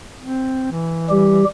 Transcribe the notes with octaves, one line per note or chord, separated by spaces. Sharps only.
C4
E3
G3 G4